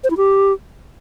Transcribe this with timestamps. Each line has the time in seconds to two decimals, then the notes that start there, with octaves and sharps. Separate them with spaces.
0.04 C5
0.10 E4
0.17 G4